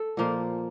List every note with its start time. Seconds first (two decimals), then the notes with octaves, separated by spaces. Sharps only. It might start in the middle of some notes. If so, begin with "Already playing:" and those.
Already playing: A4
0.17 A#2 F3 A#3